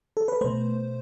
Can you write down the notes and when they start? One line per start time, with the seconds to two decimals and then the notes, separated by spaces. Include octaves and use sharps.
0.17 A4
0.28 B4
0.41 B2 A3 C5